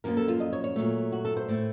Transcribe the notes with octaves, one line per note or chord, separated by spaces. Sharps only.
F#2 F3 A#3 A#4
A4
F4
D#5
C#5
C#5
A#2 F#3 A3
F#4
A4
C5
A2 A3